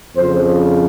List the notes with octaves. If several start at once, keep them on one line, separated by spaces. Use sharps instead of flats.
F2 C#3 F3 C5